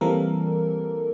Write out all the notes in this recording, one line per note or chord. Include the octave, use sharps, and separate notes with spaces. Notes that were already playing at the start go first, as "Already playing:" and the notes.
E3 G3 A#3 C4 A4 A#4